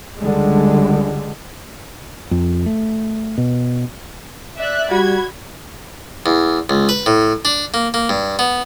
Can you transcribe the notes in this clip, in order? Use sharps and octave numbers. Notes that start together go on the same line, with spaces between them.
C#2 D3 G3 G#3
F2
A3
B2
D5 E5 F#6
G3 F#4 B5 G#6
E2
C#2
B4
A2
D4
A#3
A#3
G2
B3